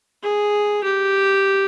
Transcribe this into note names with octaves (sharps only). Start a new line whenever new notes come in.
G#4
G4